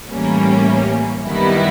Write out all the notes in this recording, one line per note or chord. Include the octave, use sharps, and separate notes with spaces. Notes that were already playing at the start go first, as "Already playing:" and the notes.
A2 E3 G3 A#3 C#4
F#2 D#3 G3 B3 E4